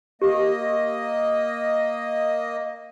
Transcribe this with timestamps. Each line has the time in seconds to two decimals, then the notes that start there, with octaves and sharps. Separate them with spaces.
0.22 A#3 G4 D#5